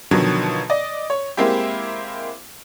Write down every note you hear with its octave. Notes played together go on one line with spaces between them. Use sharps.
B2 D3 D#3 F3 F#3
D5 D#5
C#5
G#3 A#3 C4 E4 G4